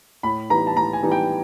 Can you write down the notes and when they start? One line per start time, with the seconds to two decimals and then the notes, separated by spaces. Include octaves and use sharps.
0.23 A2 B5
0.50 E3 G3 B3 D#4 A#5
0.67 A5
0.76 A2 A#5
0.93 G#5
1.03 E3 G3 B3 D#4
1.12 G5